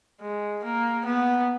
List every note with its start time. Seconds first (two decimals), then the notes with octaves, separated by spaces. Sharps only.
0.21 G#3
0.64 A#3
1.05 B3